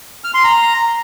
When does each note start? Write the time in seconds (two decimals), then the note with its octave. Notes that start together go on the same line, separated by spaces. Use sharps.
0.24 F6
0.34 C6
0.44 A#5